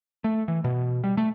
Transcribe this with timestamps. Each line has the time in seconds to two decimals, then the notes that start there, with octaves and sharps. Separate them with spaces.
0.24 A3
0.48 E3
0.64 B2
1.04 G3
1.17 A3